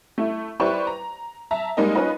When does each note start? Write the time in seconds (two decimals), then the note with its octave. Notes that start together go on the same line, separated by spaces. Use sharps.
0.18 A3 E4
0.60 E4 G4 B4 C5 D5 C#6
0.87 A#5
1.51 E5 A5 A#5
1.77 G3 G#3 A#3 D#4 A#4 D#5
1.95 C#4 D#4 F4 B4 D#5